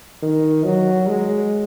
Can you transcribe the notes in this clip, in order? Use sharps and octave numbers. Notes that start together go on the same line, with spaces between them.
D#3
F#3
G#3